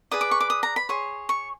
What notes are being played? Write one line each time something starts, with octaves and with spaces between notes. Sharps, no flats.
G#4 B4 D5 D#6
D6
C#6
D6
D#6
A#5
B5
G#4 C#5 C6
C#6